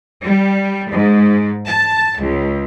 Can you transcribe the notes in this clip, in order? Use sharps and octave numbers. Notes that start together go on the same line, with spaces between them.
G3
G#2
A5
C#2